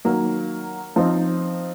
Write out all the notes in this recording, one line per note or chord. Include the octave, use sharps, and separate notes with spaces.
D#3 F#3 A#3
F3 C4 D#4